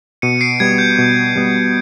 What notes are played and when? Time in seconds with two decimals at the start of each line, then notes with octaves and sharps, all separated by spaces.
0.22 B2 C#7 D#7
0.41 C7 D7
0.60 G3 B3 G#6
0.78 G6
0.98 B2
1.36 G3 B3